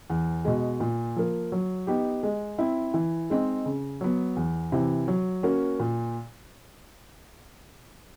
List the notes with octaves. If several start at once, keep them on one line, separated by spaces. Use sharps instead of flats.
E2
B2 G#3
A#2
F3 A#3
F#3
B3 D#4 G4
G#3
C4 E4
E3
G#3 C4 D#4
C#3
F#3 B3
E2
C3 E3
F#3
A#3 C#4 F#4
A#2